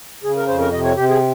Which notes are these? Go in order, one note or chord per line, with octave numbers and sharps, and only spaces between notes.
C#3 G#4
A#4
F2 C5
A#4
C3 D#5
C#5
C3 G4
G#4